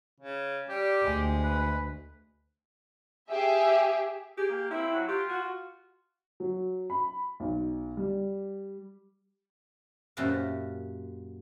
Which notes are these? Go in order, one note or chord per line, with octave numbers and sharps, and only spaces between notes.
C#3
G3 G4
D2 G#3
B4
G4 G#4 E5
G4 G#4
A#3
C4 E4
F#3
F4 G4
F#4
F#3
B5
B1
G3
F#2 A#2 F#4 G4 E5 F5